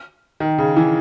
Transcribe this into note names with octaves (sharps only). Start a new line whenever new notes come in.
D#3
C#3
E3